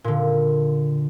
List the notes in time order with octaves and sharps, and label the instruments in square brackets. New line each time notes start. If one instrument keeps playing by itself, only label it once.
[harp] A#2 D3